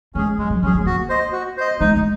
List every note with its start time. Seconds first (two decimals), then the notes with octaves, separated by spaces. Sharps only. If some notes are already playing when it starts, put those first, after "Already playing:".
0.15 G#3 C#4 G#4
0.38 F#3 G#3
0.50 F#3
0.62 F#3 C#4 G#4
0.74 G#3
0.85 A#3 F#4
1.09 C5 D#5
1.33 F#4
1.57 C5 D#5
1.80 G#3 D#4
1.96 G#3